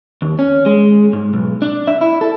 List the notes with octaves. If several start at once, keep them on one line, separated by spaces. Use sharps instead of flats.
D#2
C#4
G#3
G#2
B1
D4
E5
E4
A4